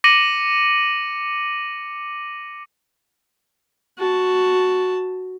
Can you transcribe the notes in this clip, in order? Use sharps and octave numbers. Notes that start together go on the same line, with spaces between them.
D6 A#6 C#7 D#7 F#7
F#4 A5